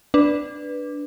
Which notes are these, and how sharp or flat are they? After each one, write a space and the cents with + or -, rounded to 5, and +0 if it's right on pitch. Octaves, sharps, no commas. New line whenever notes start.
D4 +0 B4 +0